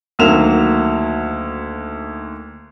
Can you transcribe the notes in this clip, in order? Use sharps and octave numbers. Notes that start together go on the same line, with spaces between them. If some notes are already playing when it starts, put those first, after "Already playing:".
D2 D#3 F#3 A#3 E7 F7